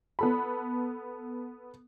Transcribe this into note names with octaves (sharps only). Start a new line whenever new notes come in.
B3 A4 B5